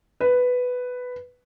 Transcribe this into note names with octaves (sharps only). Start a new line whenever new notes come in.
B4